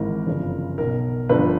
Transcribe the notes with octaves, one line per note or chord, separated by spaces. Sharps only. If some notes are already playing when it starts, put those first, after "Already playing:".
Already playing: G#1 G#2 E3 A#4
G1 F#2 C#3 F3
B1 B2 A#4
G1 G2 D3 F3 B4